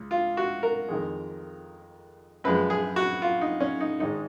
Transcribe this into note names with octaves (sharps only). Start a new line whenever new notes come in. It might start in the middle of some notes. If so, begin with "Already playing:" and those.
Already playing: C#2
F4
F#4
A#4
F2 D#3 G#3
F#2 F3 G#3 B4
G#4
F#4
F4
D#4
C#4
D#4
G#1 G#2 D#3 G#3 D#4